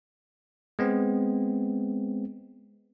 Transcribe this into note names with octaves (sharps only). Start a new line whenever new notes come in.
G#3 B3 C4